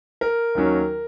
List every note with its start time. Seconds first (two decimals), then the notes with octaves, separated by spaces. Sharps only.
0.21 A#4
0.55 D#2 D#3 F#3 C#4